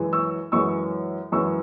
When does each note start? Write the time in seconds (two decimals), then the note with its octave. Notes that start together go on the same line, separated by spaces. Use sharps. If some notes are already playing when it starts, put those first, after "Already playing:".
Already playing: F#2 E3 G#3
0.13 C#6 E6
0.52 F#2 E3 G#3 C#6 E6
1.32 F#2 E3 G#3 C#6 E6